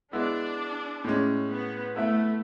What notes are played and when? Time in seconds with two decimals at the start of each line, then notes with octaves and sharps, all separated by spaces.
0.13 G#3 B3 D4 E4
1.04 A2 G#3 C#4
1.50 B3
1.95 A3 B3 E4 B4 E5